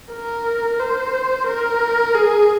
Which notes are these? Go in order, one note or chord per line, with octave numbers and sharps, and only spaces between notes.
A#4
C5
A#4
G#4